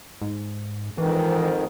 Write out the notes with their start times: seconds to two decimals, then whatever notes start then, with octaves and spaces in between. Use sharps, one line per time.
0.21 G#2
0.98 F2 G#2 D#3 E3